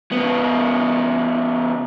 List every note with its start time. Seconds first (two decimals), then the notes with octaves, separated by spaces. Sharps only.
0.12 C#3 B3